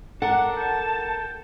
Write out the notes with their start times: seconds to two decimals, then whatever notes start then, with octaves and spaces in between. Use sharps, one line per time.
0.22 D4 A4 A#4 F#5
0.57 G5 A5